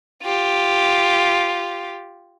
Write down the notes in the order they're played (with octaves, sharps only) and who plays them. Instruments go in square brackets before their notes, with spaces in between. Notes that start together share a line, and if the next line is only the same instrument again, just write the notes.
[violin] F4 G4